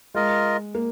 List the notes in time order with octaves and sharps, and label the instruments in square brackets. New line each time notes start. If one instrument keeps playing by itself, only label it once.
[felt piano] G#3 [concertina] F4 A#4 D#5
[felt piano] A#3